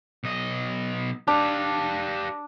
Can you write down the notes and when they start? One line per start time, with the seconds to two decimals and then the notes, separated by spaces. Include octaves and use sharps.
0.24 B1 D#5
1.28 D4 G4 F5